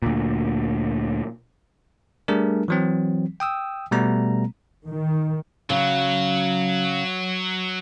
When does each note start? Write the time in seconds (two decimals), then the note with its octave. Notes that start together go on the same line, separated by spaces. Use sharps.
0.02 D2 A#2
2.28 G3 A3 D4 G#4 A#4
2.68 E3 F#3 C4
3.40 G5 D#6 E6
3.91 B2 G3 A3 B3 A#5
4.87 D#3
5.70 C#3 F#3